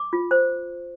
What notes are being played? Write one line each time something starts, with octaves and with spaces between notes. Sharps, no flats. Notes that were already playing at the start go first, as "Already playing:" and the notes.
Already playing: D6
F4
C5